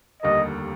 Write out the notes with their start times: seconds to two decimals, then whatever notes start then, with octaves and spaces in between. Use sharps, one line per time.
0.23 F1 D#2 D3 G3 A#3 D#5